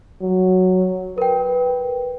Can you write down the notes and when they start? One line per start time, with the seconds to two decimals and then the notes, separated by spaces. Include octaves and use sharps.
0.22 F#3
1.18 A#4 B4 G5